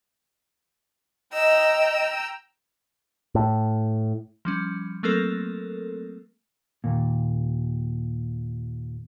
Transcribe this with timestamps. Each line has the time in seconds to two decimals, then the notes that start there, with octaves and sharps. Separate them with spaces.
1.33 D#5 G5 A#5 E6
3.35 A2
4.45 F3 G3 C#4
5.03 F#3 A3 A#3 C4 A4 A#4
6.84 D#2 A#2